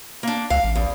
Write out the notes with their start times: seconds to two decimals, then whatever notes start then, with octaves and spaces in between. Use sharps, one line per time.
0.23 A#3 D4
0.50 C#2 F5
0.64 A1
0.76 E2